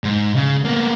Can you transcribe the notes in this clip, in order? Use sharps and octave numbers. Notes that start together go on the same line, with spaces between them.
G#2
C#3
A#3 B3